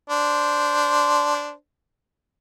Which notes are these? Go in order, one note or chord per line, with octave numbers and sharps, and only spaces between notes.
D4 C5